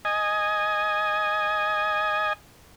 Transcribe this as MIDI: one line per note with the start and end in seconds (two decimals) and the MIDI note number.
0.05 2.33 75
0.05 2.33 80